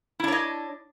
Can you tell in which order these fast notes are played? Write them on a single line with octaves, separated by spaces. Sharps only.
E4 D4 C#5 D#5